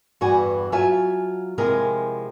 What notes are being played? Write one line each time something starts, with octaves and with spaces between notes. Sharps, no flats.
E2 G2 E3 F#4 G#5
F#3 F4 E5 G#5 A5
C3 F3 G#3 E4 G#4 A#4